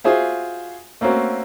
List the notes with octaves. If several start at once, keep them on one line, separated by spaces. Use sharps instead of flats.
F4 F#4 G#4 C5 E5
A3 A#3 C4 C#4 F#4